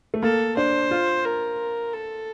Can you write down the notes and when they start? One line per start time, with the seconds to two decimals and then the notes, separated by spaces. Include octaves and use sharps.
0.14 A3
0.23 A#3 A4
0.57 D4 C5
0.91 F4
1.25 A#4
1.93 A4